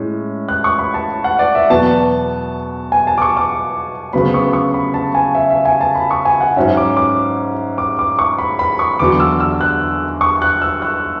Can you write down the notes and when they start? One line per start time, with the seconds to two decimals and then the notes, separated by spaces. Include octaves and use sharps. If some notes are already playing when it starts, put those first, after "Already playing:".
Already playing: A2 G#3 C#4
0.49 F#6
0.64 C#6
0.79 B5
0.94 A5
1.24 F#5
1.39 D5
1.55 E5
1.70 E2 B2 F#3 B3 A5
2.92 G#5
3.07 A5
3.18 D6
3.22 C#6
3.37 D6
4.13 D2 C#3 F#3 B3 B5
4.34 C#6
4.53 C#6
4.74 B5
4.94 A5
5.15 G#5
5.35 E5
5.50 E5
5.65 G#5
5.81 A5
5.95 B5
6.11 C#6
6.25 G#5
6.41 F#5
6.56 G#2 F#3 C#4 E5
6.77 D6
6.97 D6
7.78 D6
7.99 D6
8.19 C#6
8.39 B5
8.59 B5
8.79 C#6
8.99 E2 D3 F#3 D6
9.20 E6
9.40 E6
9.61 F#6
10.21 C#6
10.42 F#6
10.62 E6
10.82 F#6